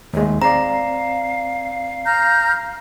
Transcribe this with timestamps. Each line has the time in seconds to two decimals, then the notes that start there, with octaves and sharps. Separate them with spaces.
0.13 D#2 G#3 A3
0.42 C4 D5 F5 A#5
2.05 A#5 F6 G6